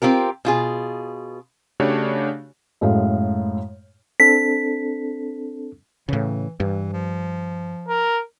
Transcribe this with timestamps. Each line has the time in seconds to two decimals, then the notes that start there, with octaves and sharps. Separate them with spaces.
0.02 C4 F4 G4 A#4
0.45 B2 F4 G#4
1.80 C#3 A3 D4 F#4 G4 C#5
2.81 F#2 A2 G#3 A4 F5
4.20 C4 D4 A4 B6
6.09 A2 C#3 E3
6.60 G2 E3
6.93 F3
7.88 A#4